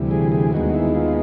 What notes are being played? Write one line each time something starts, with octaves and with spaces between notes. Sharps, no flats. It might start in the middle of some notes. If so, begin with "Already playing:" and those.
Already playing: D2 C3 E3 G3
G#4
G#4
D#2 D#3 G#3 B3 F#4
E4
F4